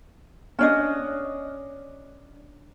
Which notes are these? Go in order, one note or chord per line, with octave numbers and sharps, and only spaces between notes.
C#4 D4 D#5